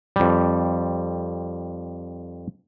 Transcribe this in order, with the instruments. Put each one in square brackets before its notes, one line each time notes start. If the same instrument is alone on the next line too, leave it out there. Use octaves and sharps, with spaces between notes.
[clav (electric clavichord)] F2 G3